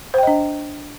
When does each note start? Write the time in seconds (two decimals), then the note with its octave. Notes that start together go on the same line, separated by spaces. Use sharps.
0.14 C5
0.18 G5
0.23 D#5
0.27 D4